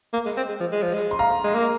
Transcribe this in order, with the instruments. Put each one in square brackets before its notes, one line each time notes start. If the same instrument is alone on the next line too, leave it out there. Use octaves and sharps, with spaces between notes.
[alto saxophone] A#3
G#3
C4
G#3
F3
G#3
F3
G#3
[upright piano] C6
F5 A#5
[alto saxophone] G#3
A#3